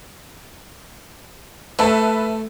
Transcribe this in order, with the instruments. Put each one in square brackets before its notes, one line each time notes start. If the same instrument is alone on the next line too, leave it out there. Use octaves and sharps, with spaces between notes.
[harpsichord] A3 [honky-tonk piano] B4 E5 A5